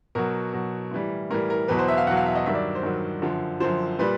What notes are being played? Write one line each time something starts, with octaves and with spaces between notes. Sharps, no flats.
B2 F#3 A#4
B2 F#3
A2 E3 G3
A2 E3 G3 A#4
A#4
E2 B2 F#3 B4
C5
E5
F5
E2 B2 F#3 F#5
F5
E5
D#5
G2 D#3 F#3 E5
D5
C5
G2 D#3 F#3
F#2 D3 F3
F#2 D3 F3 C5
A#2 G3 B4